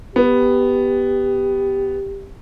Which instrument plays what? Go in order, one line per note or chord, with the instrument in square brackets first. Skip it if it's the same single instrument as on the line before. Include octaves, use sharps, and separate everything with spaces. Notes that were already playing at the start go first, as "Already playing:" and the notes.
[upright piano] B3 [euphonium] G4